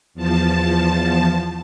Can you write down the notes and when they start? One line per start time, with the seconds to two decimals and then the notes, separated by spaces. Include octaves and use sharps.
0.14 E2 F3 A5